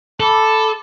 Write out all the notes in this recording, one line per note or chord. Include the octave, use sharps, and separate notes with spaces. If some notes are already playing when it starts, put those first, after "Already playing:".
A4 A5 B5 D6